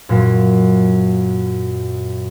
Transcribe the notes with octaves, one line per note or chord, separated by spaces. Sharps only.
F#2 A#2